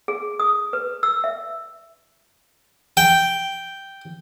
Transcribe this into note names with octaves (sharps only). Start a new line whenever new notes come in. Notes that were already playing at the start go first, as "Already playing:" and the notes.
G#4
D#6
B4
E6
E5
G5